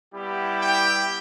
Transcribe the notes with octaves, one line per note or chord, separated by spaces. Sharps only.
G3 B3 E4 G4
G5